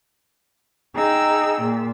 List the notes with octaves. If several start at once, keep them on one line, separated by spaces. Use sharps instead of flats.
D#4 G#4 G5 E6
A#2